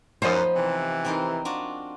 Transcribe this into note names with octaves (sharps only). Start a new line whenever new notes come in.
F#2 F3 B3 D#4 C5 D#5
C3 E3
C4 D#4 A#4
D4 F4 F#4